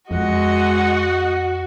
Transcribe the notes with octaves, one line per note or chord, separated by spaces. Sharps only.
F2 G#3 F#4 D#5 F#5